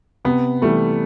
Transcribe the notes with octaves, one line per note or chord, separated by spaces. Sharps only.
C3 B3
E3 G3 A3